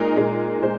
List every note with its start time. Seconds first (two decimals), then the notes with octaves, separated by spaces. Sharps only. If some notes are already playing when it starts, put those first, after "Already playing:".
Already playing: A#2 G#3 D#4 A#4
0.17 A#2 G#3 D#4
0.62 A#2 G#3 C5